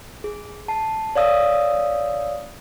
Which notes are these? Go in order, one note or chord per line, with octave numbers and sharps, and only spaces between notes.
G#4
A5 C7
C#5 D5 F5 D#6 E6